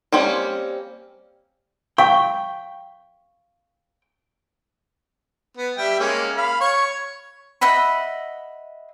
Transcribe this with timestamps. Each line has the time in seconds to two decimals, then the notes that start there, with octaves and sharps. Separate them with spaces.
0.12 G3 A#3 C4 C#4
1.98 F5 G5 C#6
5.57 B3
5.77 G3 E5 G5
5.99 G#3 A#3 C#4
6.36 F5 B5
6.60 C#5 C#6
7.61 D#5 E5 F#5 B5